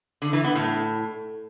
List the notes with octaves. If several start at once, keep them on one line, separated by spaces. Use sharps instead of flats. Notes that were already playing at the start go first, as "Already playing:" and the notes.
D3
E3
B3
A2